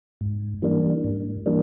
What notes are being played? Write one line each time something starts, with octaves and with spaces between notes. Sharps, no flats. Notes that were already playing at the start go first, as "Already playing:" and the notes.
G#2
E3 G3 A#3 D4
G#2
E3 G3 A#3 D4